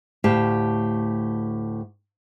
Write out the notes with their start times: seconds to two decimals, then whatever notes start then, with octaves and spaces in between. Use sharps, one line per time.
0.24 D2 A2 G4 F5 A5